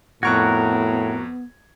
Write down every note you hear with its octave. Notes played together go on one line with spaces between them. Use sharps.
F2 A2 B3 F#4 A#4 C#6 F#6 G#6